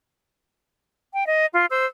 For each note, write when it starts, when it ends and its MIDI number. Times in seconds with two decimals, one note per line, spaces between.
1.14 1.25 79
1.26 1.45 75
1.53 1.66 65
1.70 1.86 72
1.70 1.86 88